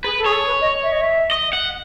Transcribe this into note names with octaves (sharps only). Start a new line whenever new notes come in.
G#4 B4
A4
G#4 C#5
A4
B4
D#5
E5
D#5
E5
D#5
F#5